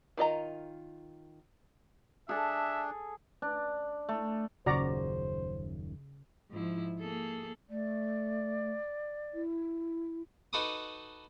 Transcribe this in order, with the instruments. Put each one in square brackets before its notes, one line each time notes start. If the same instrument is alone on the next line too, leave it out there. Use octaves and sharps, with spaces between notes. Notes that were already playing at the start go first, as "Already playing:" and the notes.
[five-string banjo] D#3 F4 D#5 A#5
[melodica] D4 [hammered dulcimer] G#4 A4 [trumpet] E5
[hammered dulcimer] D4
A3
[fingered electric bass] D#1 F#2 [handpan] C#3 [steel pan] F#4 D5 A#5 [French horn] C5
[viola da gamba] G#2 F3 E4
A#3 G#4 A4
[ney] A3 [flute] D5
[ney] E4
[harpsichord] D#4 F#4 A4 B4 D6 D#6